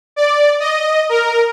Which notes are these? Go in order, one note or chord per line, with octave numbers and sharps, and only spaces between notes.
D5
D#5
A#4